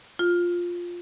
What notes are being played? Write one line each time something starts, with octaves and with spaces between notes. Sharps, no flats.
F4